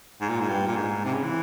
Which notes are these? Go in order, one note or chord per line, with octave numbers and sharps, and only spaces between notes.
G#2
A#2
G#2
G2
A#2
G#2
C3
C#3
E3